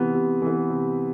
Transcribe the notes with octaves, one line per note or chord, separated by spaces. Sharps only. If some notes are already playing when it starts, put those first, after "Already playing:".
Already playing: C3 E3 B3
C3
E3 B3
C3